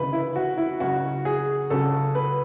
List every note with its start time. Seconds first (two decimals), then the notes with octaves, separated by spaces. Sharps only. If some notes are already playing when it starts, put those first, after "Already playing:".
Already playing: D2 C#3 E3 B4
0.13 E4
0.36 F#4
0.58 E4
0.80 C#2 C#3 F#3 C#4 F#4
1.25 G#4
1.70 C#2 C#3 F#3 C#4 A4
2.15 B4